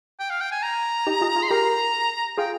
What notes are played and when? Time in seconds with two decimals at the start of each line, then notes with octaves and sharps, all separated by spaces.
0.20 G5
0.30 F5
0.41 G5
0.52 G#5
0.63 A#5
1.07 D#4 G4
1.21 F4 G#4
1.36 F4 G#4
1.43 C6
1.50 G4 A#4 A#5
2.37 F4 G#4 G5